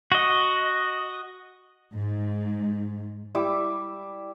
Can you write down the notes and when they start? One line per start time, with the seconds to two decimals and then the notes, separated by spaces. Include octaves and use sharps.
0.12 F#4 D#5
1.94 G#2
3.35 G3 E4 D6 E6